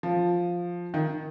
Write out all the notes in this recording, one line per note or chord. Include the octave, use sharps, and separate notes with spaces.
F3
D#3